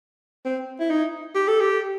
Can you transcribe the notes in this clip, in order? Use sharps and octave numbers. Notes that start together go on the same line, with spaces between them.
C4
E4
D#4
G4
A4
G4